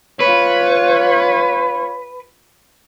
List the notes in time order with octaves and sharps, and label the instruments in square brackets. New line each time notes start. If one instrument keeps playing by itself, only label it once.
[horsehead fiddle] F4 C#5 [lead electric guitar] B4